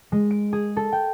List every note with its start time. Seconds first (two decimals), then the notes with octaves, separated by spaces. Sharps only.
0.12 G#3
0.31 D7
0.53 G#4
0.77 A4
0.92 G5